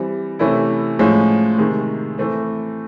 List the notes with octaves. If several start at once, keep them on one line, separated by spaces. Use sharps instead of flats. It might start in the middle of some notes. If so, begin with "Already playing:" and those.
Already playing: E3 G3 C4
C3 E3 A3 C#4 E4
A2 F3 G#3 C#4
C3 D#3 G#3
E3 A3 C4